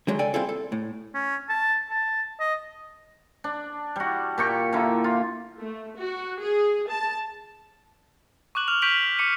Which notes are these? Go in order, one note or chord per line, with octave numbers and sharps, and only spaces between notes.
D3 D#3 F#3 G#3
C#2 A4 D5 G5 G#5
G3 C4 E4 F4 G#4 A4
A4
A2
C#4
A5
A5
D#5
D4
G3 F#4
A#2 G4 C#6
D3 A#3 E4
F4
A3
F#4
G#4
A5
C#6 D6 F#6 F#7
F6 F7
C#6 G6 B6 D7 F7 F#7
D6 C#7 D#7